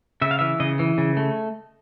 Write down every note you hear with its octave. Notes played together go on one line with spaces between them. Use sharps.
C#3 E5
F5
E3 E5
C#3 D#5
E3
C#3
A3